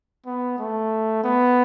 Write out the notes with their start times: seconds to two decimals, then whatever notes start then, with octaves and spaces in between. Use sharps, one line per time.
0.26 B3
0.59 A3
1.24 B3